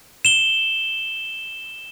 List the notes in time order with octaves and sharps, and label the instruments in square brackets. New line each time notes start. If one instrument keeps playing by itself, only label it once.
[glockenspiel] E7 G7